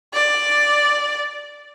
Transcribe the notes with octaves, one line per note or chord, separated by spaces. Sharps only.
D5